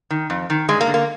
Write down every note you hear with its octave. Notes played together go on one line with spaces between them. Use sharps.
D#3
F2
D#3
G2 G#3
A#3
D3
A#3